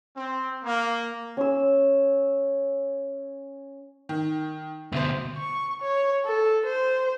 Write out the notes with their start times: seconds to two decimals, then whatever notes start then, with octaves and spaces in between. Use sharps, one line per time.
0.16 C4
0.64 A#3
1.37 C#4 E6
4.09 D#3
4.92 D2 B2 C5 E5
5.37 C#6
5.82 C#5
6.25 A4
6.65 C5